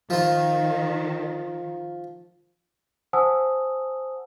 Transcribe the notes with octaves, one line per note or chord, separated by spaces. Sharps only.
D#3 F3 F4
C5 F#5 G#5 A5 D#6 E6